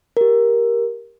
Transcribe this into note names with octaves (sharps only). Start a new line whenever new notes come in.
G4 A#4